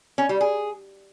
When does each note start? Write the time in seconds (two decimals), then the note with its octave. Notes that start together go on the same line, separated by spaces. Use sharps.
0.18 C#4
0.29 G3
0.41 G#4